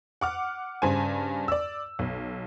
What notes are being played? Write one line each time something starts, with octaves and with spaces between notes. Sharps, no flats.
F#5 D6 F6
G2 C#3 C5 G#5
D5 E6
B1